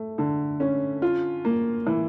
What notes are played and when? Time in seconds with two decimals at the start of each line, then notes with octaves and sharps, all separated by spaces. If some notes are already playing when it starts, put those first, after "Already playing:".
Already playing: A3
0.18 D3
0.60 C#4
1.02 F4
1.45 A#3
1.86 E3